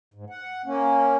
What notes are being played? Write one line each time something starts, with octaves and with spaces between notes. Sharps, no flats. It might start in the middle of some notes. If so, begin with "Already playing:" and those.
G#2
F#5
A#3 C#4